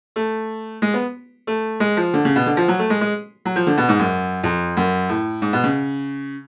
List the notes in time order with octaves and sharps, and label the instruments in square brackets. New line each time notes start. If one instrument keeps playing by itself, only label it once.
[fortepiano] A3
G#3
B3
A3
G#3
F3
D3
C#3
B2
D3
F3
F#3
A3
G#3
G#3
F#3
F3
D3
B2
G#2
F#2
F2
F#2
A2
G#2
B2
C#3